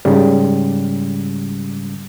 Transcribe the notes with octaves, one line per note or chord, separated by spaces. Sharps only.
G#2 C#3 G3